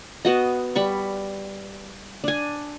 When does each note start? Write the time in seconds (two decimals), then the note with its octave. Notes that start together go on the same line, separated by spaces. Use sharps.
0.25 B3 F#4 D#5
0.76 G3 B5 C#6
2.24 D4 G#5